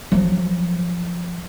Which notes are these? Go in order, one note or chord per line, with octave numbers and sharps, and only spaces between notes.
F3 F#3